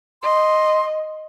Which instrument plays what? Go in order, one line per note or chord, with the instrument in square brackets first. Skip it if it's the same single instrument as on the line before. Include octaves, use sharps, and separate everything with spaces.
[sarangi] D#5 [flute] C6